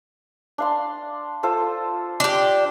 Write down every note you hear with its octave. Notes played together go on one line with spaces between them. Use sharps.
D4 F5 C6
F4 A4 C5
D4 G4